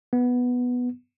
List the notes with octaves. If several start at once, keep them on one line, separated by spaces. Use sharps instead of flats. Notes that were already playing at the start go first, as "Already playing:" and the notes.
B3